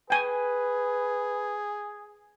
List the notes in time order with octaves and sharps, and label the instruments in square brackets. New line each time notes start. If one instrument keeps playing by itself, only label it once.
[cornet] G#4 [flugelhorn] B4 [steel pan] G5 G#5